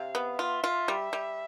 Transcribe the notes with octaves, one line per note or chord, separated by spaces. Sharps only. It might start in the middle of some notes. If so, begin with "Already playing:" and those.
Already playing: C3 F5
B3
F4 E5
F4
G3
G3